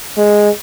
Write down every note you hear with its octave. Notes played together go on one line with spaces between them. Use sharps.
G#3